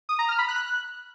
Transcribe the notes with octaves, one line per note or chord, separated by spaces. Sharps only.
D#6
A#5
F6
B5
F#6